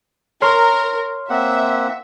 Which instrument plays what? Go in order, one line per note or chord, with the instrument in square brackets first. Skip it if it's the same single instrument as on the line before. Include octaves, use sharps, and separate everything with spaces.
[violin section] A#4 [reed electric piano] C#5 C6 F6
[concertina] A#3 C4 F#5 [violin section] E5